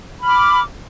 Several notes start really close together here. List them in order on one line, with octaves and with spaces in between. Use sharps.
B5 F6 D6